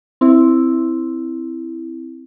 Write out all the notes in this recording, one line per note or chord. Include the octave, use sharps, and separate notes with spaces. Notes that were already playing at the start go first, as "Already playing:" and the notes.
C4 E4